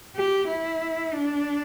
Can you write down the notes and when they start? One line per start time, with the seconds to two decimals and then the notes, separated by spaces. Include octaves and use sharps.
0.16 G4
0.48 E4
1.13 D4